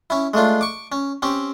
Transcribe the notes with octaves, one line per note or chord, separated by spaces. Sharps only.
C#4 E4
G#3 A3 D4 F4
C#6 D6
C#4
C4 C#4 G4